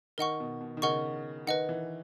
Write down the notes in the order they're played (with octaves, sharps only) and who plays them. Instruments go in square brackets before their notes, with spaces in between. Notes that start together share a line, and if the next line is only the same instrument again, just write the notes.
[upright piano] D#3 [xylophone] A#4 D#5 F#5 C#6
[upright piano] B2
B2
D#3
[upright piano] C#3 [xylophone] A#4 D#5 F#5 C#6
[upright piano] D#3 [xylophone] B4 D#5 F#5
[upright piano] E3